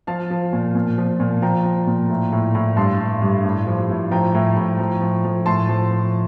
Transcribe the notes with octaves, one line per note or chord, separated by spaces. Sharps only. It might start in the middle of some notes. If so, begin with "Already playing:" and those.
F3 F5 A5
F3
A#2
A#2
F3
A#2
F3 G5 A#5
F3
A#2
A2
A2
A2
G2 A5 C6
G2
G2
A2
F3
A2
F3 G5 A#5
A2
A2
F3
F3
F3
A2 A5 C6
F3
F3